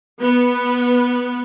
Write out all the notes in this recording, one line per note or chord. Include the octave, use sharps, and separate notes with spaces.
B3